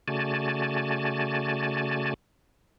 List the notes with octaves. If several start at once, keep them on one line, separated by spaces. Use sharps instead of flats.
C#3 A3 F#4 D5 G#5 A5